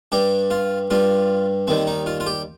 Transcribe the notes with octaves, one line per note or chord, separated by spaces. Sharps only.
G2 G3 G4
F4
G2 G3 F4
D#2 D#3 G3 C4
D#4
F4
F4
G4